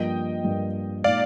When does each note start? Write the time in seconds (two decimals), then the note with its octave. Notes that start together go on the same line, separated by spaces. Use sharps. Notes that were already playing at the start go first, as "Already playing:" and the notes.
Already playing: G2 F3 A#3 D#5 G5
0.44 G2 F3 A#3
1.04 A#2 G#3 D#4 D5 F5